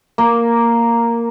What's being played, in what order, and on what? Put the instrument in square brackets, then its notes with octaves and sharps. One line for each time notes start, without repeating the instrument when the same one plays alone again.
[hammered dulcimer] A#3